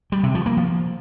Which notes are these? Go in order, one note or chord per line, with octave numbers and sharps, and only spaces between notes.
G3
C3
F3
A#3
F3